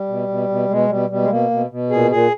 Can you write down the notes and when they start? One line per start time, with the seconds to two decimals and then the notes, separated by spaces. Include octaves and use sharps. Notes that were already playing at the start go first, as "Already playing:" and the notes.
Already playing: G3
0.08 B2
0.28 B2
0.49 B2
0.69 B2 G#3
0.89 B2 G3
1.09 B2 G3
1.22 G#3
1.30 B2 A#3
1.50 B2
1.70 B2
1.90 A#2 G#4
2.11 A#2 G#4